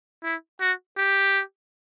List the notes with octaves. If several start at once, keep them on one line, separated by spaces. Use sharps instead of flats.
E4
F#4
G4